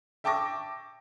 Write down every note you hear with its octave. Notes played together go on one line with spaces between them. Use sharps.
E5 G5 A5 C#6 D6 A#6